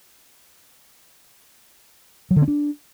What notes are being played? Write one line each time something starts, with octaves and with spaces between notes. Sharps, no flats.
F#3
D3
C4
D4